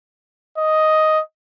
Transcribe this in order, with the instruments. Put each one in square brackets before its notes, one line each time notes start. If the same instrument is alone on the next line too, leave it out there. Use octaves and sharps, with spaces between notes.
[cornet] D#5